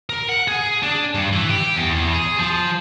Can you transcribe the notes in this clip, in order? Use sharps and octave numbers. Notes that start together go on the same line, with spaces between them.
A#4
F#5
G#4
D4
G2
E3
G4
E2
E2
G#4
F3